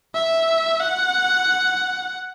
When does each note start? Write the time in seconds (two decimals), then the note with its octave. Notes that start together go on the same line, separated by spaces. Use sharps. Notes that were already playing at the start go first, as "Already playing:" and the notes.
0.14 E5
0.80 F#5